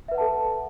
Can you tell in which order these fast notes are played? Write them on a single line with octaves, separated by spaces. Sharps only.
E5 B4 F#5 A5 A4